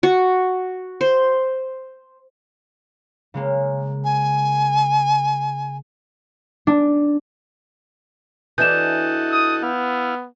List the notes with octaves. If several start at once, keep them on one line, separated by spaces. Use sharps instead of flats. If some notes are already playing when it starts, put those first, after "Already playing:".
F#4
C5
C#3 G#3 A#3
G#5
D4
E3 D4 F#4 A4 D#5 G6 E7
D#6
B3 E4 F5